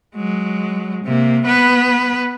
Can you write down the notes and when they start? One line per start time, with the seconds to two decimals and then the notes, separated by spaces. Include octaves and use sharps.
0.15 F#3 G#3
1.04 C3 A#3
1.45 B3 B4